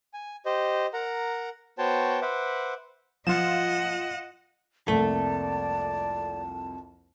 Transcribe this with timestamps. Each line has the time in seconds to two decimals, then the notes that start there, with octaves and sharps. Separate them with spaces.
0.14 G#5
0.46 G4 C5 D#5
0.93 A#4 F#5 A#5
1.78 B3 F#4 C5 C#5 G5 A5
2.22 B4 C5 E5 F#5 D6
3.27 F3 F4 D#5 F#5 E7
4.88 C2 F2 A3 A#3 D5 A5